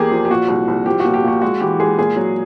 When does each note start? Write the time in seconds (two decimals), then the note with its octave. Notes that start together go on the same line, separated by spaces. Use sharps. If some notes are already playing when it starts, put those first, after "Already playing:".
Already playing: E2 A#3 G4 G#4
0.11 F3
0.25 G4
0.30 A#2 F#4
0.48 C2
0.68 C2
0.86 F3 G4
1.00 A#2 F#4
1.14 G4
1.23 A#2 F#4
1.42 G#3 F#4
1.60 E3 G4
1.80 G#3 G#4
1.99 A#2 G#4
2.16 F#3